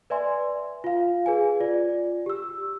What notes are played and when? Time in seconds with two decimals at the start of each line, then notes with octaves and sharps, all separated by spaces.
0.10 B4 D5 E5 G#5 C6
0.84 F4 F5
1.26 G#4 B4 G#5
1.60 F4 D5
2.26 G4 E6